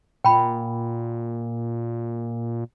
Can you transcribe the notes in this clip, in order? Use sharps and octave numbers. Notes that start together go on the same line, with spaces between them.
A#2 G5 B5